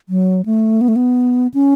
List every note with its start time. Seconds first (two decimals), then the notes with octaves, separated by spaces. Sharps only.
0.09 F#3
0.46 A3
0.81 B3
0.88 A3
0.96 B3
1.54 C#4